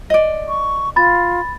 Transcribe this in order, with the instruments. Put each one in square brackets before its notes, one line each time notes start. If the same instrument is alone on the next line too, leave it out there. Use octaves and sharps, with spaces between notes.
[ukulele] D5 D#5
[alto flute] C#6
[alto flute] F4 [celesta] B5 A6